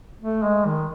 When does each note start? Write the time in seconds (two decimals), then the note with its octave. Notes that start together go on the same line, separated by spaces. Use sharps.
0.21 A3
0.43 G#3
0.66 D#3